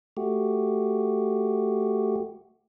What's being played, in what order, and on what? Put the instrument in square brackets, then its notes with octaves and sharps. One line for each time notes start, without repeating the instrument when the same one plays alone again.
[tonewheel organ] A3 F#4 G4